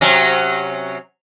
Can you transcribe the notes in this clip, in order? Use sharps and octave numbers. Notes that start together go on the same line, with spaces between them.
C3 F#3 C#4